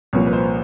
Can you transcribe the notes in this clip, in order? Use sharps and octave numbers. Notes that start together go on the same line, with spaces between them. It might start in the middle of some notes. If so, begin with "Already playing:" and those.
C2 A#2 F3 A#3 C#5
B4
C5